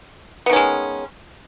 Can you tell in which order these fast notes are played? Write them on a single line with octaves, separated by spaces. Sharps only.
B3 D#3 C#4 G#3